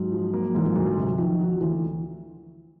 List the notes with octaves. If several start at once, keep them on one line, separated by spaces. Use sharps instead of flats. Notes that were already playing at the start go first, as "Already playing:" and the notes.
Already playing: G#2 F#3
F3
A#3
G#2 E3
F3
D2 F#3
C3
D#3 F3
F#3
D2 E3